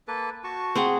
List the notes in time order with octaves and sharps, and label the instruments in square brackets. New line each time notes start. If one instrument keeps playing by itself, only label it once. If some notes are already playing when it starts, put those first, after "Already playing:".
[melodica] A#3 A4 B4
F#4 A5 C#6
[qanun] C4 G#4 F#5